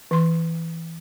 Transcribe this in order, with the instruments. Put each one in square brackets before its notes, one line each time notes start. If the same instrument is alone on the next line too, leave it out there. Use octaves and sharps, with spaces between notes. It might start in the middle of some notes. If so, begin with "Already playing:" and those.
[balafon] E3 C6